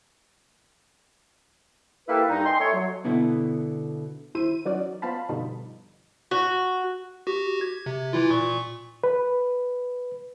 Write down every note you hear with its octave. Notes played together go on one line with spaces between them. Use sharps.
A#3 E4 G4 A4 B4
G2 D#4
D#5 G5 G#5 C6
A3 C#5
F#3
B2 D3 B3 E4
G1 D#2 E4 C5 E5 D#7
E3 F#3 C#4 D#4 F#4 D5
B3 F4 C5 F5 A5 B5
G2 B2 D3 F3 G3 D#4
F#4
F#4 G4
G#6
C3
E3 E4 F4
A#2 C#6
B4